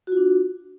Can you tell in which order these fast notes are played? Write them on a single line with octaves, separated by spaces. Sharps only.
F#4 F4 D4